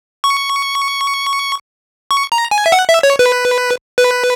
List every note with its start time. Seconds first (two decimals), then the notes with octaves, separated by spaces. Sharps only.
0.24 C#6
2.11 C#6
2.32 A#5
2.51 G#5
2.66 E5
2.72 F#5
2.88 E5
3.03 C#5
3.19 B4
3.98 B4